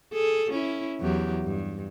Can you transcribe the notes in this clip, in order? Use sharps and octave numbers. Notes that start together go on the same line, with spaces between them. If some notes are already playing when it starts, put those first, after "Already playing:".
G#4 A4
C#4 E4
E2 F#3 G4
G2